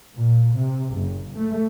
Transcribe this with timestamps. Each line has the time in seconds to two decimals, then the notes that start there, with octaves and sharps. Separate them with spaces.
0.14 A#2
0.54 C3
0.92 F#1
1.36 A3